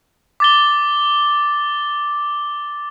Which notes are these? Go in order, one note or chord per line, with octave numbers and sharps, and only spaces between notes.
D6 A6 G7